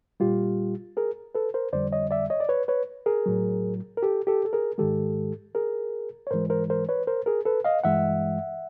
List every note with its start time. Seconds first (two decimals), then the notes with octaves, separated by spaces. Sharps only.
0.20 A#2 G3 F4 G4
0.97 G#4 A#4
1.35 A4 B4
1.54 A#4 C5
1.73 F2 D3 G3 C5 D5
1.93 C#5 D#5
2.11 D5 E5
2.30 C#5 D#5
2.40 D5
2.49 B4 C#5
2.68 B4 C#5
3.06 G#4 A#4
3.26 A2 F#3
3.97 A#4
4.03 G4 A4
4.27 G4 A4
4.45 A4
4.53 G#4 A#4
4.78 G#2 D#3 G#3 G4 A4
5.55 G#4 A#4
6.27 C#5
6.31 G#2 E3 G#3 A#4 C5
6.50 A#4 C5
6.70 A#4 C5
6.89 B4 C#5
7.07 A#4 C5
7.26 G#4 A#4
7.45 A4 B4
7.65 D#5 F5
7.84 G2 E3 G#3 E5 F#5